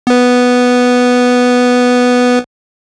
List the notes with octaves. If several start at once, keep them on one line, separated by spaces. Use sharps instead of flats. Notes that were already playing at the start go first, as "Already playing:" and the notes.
B3 B4